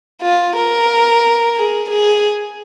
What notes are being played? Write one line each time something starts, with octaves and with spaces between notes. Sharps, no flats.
F4
A#4
G#4
G#4